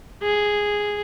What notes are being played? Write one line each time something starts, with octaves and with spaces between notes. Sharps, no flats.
G#4